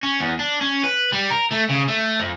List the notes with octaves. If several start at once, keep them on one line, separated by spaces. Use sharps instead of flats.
C#4
E2
D4
C#4
B4
G3
A#4
A3
C#3
A3
F2